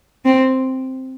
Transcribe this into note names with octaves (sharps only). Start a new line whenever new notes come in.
C4